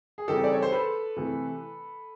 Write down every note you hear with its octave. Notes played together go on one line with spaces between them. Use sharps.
G#4
C#3 E3 G3 C4 D#4 G4 A4
D5
C#5
C5
A4 B4
C3 E3 A3